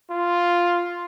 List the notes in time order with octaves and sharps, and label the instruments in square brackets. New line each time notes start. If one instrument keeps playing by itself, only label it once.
[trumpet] F4